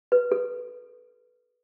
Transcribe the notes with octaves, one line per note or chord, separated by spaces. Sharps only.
B4
A4